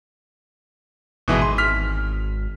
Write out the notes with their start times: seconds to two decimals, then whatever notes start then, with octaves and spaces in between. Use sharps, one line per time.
1.28 G#1 B2 E3 G#3
1.42 C6
1.58 F6 B6